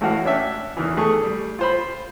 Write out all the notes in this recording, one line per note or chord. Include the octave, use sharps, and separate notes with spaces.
A1 A2 E3 F#4 F5
C#4 D4 E5 G5
E2 D#3 E3
A3 G#4 C#6
G3
F4 C5 B5